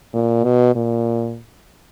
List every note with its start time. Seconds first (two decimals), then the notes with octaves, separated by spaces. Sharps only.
0.13 A#2
0.44 B2
0.75 A#2